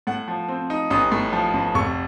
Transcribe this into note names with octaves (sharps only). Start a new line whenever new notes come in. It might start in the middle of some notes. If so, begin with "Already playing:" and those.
A2 F#5
F3
C4
D#4
A1 D#6
A2
F3
A1
F1 C#6